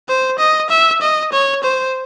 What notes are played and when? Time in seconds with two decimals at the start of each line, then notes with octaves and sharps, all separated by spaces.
0.08 C5
0.39 D#5
0.70 E5
1.02 D#5
1.32 C#5
1.64 C5